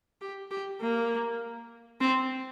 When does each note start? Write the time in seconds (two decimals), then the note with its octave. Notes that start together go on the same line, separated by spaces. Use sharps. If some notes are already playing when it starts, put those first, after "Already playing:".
0.21 G4
0.51 G4
0.80 A#3
2.00 C4